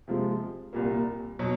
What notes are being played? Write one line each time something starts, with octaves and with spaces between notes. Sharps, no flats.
C3 F3 G#3
C2 A#2 G3 A#3
B2 F#3